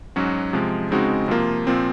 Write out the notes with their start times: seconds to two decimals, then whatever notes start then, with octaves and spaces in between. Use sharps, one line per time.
0.16 G#2 F#3 C#4 F#4
0.53 C3 F3 G#3
0.90 C#3 G#3 C4 D#4 F#4
1.28 C3 F3 A#3 F4
1.67 A#2 F3 C4